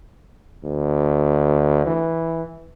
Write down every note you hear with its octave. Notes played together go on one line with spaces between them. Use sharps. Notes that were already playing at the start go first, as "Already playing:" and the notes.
D2
E3